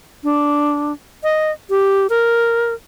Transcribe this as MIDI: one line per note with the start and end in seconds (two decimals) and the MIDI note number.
0.24 0.93 62
1.23 1.52 75
1.70 2.07 67
2.10 2.74 70